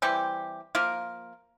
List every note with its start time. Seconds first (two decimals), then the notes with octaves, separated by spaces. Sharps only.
0.02 E3 G3 C4 G4
0.75 F3 A#3 F4 A#4